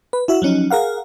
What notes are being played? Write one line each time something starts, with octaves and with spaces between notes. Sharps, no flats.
B4
E4 F#4 E5
F3 F#3 C#4 D#4
G#4 A#4 F5 F#5